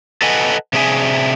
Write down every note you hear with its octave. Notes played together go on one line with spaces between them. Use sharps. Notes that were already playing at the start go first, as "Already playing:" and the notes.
A4 B4 D#5 F#5 G#5
C3 D4 G#4 E5 G#5